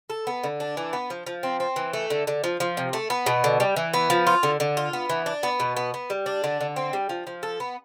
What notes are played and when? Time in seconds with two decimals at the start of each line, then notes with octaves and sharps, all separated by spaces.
0.10 A4
0.27 B3
0.43 D3
0.60 D4
0.77 E3
0.93 B3
1.10 F3
1.27 F3
1.43 C4
1.60 C4
1.76 E3
1.93 A3
2.10 D3
2.27 D3
2.44 F3
2.60 F3
2.77 C3
2.93 A3
3.10 B3
3.26 B2
3.44 D3
3.60 G3
3.76 E3
3.94 B3
4.10 F3
4.27 F4
4.43 D3
4.60 D3
4.77 F4
4.93 B3
5.10 E3
5.26 D4
5.43 B3
5.60 B2
5.77 B3
5.94 B3
6.10 G3
6.26 D4
6.44 D3
6.61 D3
6.76 C4
6.93 G3
7.09 F3
7.27 F3
7.43 A4
7.60 B3